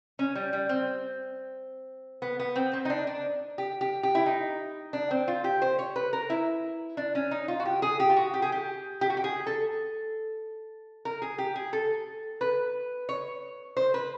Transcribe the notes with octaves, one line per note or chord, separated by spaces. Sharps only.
C#4
G3
G3
C4
B3
B3
C4
C4
D#4
D4
D4
G4
G4
G4
E4
D#4
D4
C4
F4
G4
C5
C#5
B4
A#4
E4
D4
C#4
D#4
F4
F#4
G4
G#4
G4
F4
F#4
G4
G#4
G4
G4
F#4
G4
G#4
A4
A#4
G#4
G4
G#4
A4
B4
C#5
C5
B4